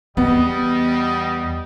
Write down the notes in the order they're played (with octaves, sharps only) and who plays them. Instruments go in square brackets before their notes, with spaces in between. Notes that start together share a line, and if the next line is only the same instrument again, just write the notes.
[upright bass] E2 [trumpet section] G3 D#5 [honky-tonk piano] B3